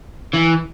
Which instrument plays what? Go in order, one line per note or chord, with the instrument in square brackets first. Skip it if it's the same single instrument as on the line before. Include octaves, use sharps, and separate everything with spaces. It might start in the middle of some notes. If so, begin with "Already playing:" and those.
[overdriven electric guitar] E3